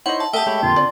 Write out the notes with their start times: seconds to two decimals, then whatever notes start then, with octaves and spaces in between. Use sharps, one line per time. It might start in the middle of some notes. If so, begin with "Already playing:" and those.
0.06 D#4 E4 C5 C#5 D#5 F#5
0.20 A5
0.33 A3 G4 A#4 E5 G5 A5 D#6
0.47 G#3 A3 G4 C#5 B5
0.63 F2 A#2 D3 F4
0.76 D3 C4 D5